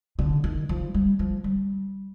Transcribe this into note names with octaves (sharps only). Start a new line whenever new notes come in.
D3
D#3
F3
G3
F3
G3